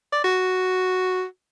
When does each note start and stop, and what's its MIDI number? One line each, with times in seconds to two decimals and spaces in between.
0.12 0.22 74
0.24 1.24 66